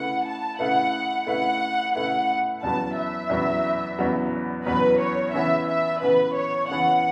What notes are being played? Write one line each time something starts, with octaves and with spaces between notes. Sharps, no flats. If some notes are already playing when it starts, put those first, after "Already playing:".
Already playing: C#3 A3 E4 B4 F#5
A5
C#3 A3 E4 B4 F#5
C#3 A3 E4 B4 F#5
C#3 A3 E4 B4 F#5
E2 C#3 F#3 B3 A5
E5
E2 C#3 F#3 B3
E2 C#3 F#3 B3
E2 C#3 F#3 B3 B4
C#5
C#3 E3 B3 E5
E5
C#3 E3 B3 B4
C#5
C#3 E3 B3 F#5